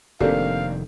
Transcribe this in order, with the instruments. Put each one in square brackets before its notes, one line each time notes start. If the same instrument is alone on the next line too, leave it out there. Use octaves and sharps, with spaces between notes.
[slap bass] F1 D#3 [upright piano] A#3 C4 D4 [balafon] G4 A4 [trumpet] F5